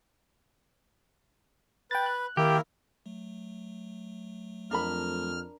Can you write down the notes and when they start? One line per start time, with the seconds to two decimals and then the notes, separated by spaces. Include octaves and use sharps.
1.91 B4 G5 A6
2.06 F#6
2.37 D#3 A#3 E4 G4 A#4
3.06 F#3 A3
4.71 F2 D4 A#4 B5 F6